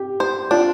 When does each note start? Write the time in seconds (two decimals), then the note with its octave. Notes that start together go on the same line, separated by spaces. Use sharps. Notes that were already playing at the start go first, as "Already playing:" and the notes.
Already playing: G4
0.20 C5
0.51 D4 F4